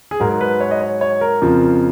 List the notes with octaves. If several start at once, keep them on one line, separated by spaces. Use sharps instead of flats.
G#4
G#2 F#3 A#4
A#4
B4
C#5
D#5
C#5
C#5
A#4
F2 C#3 F3